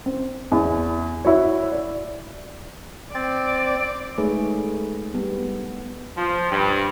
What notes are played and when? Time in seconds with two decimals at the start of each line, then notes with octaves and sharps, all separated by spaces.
0.06 C4
0.52 E2
1.25 E4 F#4 C#5
1.72 D5
3.15 C4 D5 A6
4.18 G#3 A3 D#4 G#4 B4 C#5
5.14 G3 B3
6.16 F3
6.50 G2